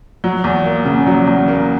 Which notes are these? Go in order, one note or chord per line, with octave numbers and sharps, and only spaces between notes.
F#3
E2
A#3
C#3
F#3
E2
A#3